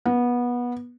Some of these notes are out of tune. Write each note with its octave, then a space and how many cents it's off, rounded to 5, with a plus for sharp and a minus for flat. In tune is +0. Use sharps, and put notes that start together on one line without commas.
B3 -20